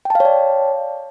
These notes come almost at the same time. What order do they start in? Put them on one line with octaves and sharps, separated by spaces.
G5 A5 F5 C#5 D5